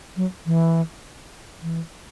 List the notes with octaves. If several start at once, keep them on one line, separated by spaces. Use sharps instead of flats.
F#3
E3
E3